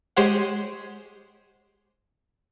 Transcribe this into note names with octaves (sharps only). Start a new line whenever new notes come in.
G#3 G4 C5 C#5 F#5